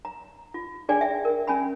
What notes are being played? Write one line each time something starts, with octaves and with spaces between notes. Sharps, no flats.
A#5
F4
D4 G#4 D5 G5 G#5
E5 G5
A#4
C#4 G#5 B5